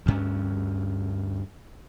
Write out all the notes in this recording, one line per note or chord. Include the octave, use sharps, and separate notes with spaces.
D2 G2 C#4